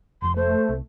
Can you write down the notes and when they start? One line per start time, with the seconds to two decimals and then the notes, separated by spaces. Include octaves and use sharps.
0.22 F1 F2 C6
0.36 A3 C5
0.69 C2